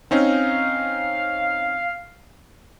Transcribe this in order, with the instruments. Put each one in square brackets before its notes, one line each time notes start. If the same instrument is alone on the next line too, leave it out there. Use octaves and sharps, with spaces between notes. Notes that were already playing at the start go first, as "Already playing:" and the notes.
[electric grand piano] C4 C#4 D#4 [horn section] F5